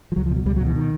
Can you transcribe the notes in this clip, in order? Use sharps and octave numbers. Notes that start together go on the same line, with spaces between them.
F3
C#2 F#3
F3
B2
F#3
C#2 G3
F#3
B2
E3
D#3